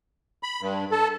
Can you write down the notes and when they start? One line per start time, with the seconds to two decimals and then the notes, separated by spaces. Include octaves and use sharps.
0.43 B5
0.61 G2
0.92 A4